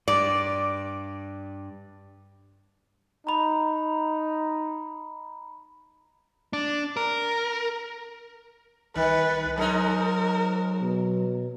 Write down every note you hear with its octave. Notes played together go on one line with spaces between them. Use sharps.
G2 D5
D#4 A#5 B5
D4
A#4
C2 D#3 B4
G#2 F#3 D#4 A#4
B2